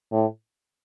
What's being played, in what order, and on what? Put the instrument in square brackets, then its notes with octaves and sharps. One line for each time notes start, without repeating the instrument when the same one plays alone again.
[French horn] A2